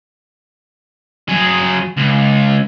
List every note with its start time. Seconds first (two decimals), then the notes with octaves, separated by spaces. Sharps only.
1.29 F#3 G#4
1.97 C#2